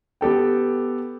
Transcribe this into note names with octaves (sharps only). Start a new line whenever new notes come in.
B3 G4 A4 G5